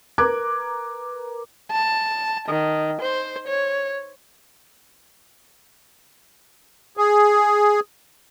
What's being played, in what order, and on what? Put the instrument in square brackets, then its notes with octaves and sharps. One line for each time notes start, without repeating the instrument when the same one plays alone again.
[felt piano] A#4 B4 A#5 D6 F#6 G#6
[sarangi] A5
D#3
C5
C#5
[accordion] G#4